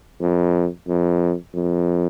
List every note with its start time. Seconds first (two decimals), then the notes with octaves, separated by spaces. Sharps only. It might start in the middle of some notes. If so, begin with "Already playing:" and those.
0.21 F2
0.88 F2
1.54 F2